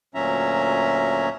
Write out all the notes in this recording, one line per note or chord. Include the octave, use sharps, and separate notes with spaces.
D2 A#2 F#3 C#4 E5 A#5